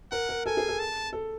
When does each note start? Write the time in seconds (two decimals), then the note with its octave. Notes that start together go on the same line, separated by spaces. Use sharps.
0.11 A#4 F#5
0.29 A#4
0.46 A4 G#5
0.57 G#4
0.68 A4
0.79 A5
1.13 A4